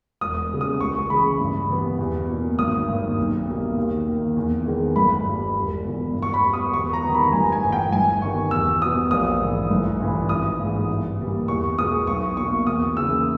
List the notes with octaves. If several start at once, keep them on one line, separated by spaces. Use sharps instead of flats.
E1 D#6
E2 C#3 G3
D#6
C#2 C#6
C#3 E3 G#3 B5
G2
E3 G3 B3
E2
B2 A#3
G#1 D#6
G2 D#3 A#3
B1
B2 G3 A#3
D#2
D#3 A#3
E2
D#3 G#3 B3
G1 B5
G2 G3
E1
E2 B2
G2
C#6
B5
G3 B3
D#6
E2 C#6
A#5
D#3 G3 B3
B5
A#5
G1 G#5
G#5
G2 E3
G5
G1 G#5
G2 D#3 G3 B3 C#6
E2 E6
B2 G3 B3 D#6
A#1 D#6
G#2 E3
G1
G2 E3
G#1 D#6
G#2 E3
G2
E3 G3 A#3
E2 C#6
B2 G#3 B3 D#6
B1 C#6
B2 A#3 C#6
E2 D#6
C#3 E3 A#3 E6